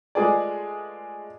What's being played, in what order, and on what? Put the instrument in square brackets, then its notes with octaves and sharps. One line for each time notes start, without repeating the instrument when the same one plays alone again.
[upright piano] G#3 A3 F4 G#4 B4 D5